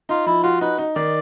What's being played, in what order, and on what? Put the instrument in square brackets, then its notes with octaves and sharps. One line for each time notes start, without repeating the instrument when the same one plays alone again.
[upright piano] D#4 [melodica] F4
[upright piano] F3 [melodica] E4
[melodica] F4 [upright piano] F#4
[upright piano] D#4 [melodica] B4
[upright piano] D#4
[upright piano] D#3 [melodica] D5